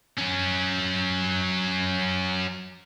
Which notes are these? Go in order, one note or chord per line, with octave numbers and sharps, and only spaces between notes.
F#3 C#4